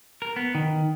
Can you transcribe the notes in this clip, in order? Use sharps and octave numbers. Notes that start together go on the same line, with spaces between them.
A#4
B3
D#3